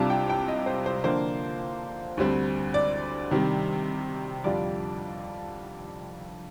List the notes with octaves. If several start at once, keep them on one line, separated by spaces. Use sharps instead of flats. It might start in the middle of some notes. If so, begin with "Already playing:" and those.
Already playing: C2 C3 G3 D4 F4 A5
G5
G5
D#5
C5
C5
D3 F3 A#3 D4 F4 C5
D2 D3 G3 C4
D5
C3 D#3 G3
F2 D3 G3 D4 F4 D5